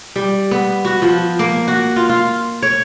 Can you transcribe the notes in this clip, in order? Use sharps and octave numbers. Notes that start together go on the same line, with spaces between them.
G3
B3
F#4
F3
A#3
F#4
F4
F4
C#5